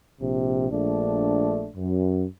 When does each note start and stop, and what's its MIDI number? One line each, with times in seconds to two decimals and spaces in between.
0.21 0.70 34
0.21 0.70 48
0.72 1.68 34
0.72 1.68 57
0.72 1.68 62
1.76 2.24 42